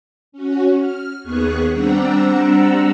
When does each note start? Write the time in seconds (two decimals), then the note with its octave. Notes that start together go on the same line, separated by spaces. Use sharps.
0.32 C#4 F#4
0.76 F6
1.23 D#2 B3 G#4 C#6 F#6
1.73 G3 C4 D4 F#5 A#5 E6